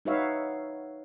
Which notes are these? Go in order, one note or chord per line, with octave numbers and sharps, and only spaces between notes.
D#4 F#4 B4 C#5 E5 F5